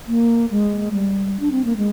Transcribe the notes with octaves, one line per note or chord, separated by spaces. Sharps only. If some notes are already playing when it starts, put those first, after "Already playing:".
A#3
G#3
G3
D4
C4
A#3
G#3